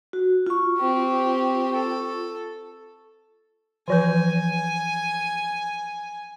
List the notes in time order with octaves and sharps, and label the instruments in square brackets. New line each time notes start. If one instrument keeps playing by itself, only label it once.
[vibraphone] F#4
F4 C#6
[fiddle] C4 G4
A4
[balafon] E3 F3 B4 [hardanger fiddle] G#5